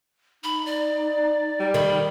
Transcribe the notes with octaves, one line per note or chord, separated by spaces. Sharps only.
D#4 B5
D5
G3
D#3 B5